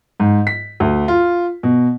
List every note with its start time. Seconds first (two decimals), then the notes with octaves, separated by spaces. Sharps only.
0.20 G#2
0.47 B6
0.80 D2
1.08 F4
1.63 B2